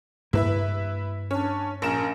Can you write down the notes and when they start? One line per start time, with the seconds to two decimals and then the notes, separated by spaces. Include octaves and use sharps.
0.33 G2 A#3 E4 B4 E5
1.31 C#4 D4
1.82 A#1 C#4 A#4 E7